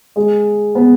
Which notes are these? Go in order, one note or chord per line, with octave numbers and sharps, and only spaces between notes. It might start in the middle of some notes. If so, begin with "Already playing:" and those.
G#3
B3